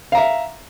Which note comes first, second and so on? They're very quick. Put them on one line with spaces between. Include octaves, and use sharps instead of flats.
F5 A#5 E5